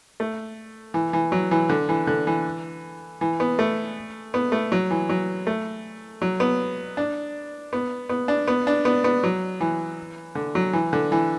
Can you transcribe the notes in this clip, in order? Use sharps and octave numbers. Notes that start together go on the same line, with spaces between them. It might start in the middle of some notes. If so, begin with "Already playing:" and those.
A3
E3
E3
F#3
E3
D3
E3
D3
E3
E3
B3
A3
B3
A3
F#3
E3
F#3
A3
F#3
B3
D4
B3
B3
D4
B3
D4
B3
B3
F#3
E3
D3
F#3
E3
D3
E3